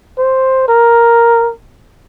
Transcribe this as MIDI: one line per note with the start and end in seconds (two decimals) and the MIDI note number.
0.18 0.65 72
0.68 1.52 70